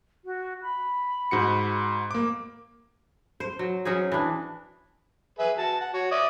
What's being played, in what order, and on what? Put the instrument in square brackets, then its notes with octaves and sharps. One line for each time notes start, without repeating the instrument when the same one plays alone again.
[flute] F#4
B5
[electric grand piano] G#2 F#4 C#7
A#3 D6
[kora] C5
F#3
F#3 C#4 D#4 G#4
E3 D4
[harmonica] G#4 B4 E5
F#4 A5
F#5
F#4 C#5
D5 E5 D#6